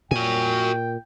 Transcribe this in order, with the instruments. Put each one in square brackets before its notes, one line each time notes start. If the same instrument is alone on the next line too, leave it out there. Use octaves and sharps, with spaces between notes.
[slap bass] A#2 [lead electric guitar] F#4 G#5 [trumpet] G5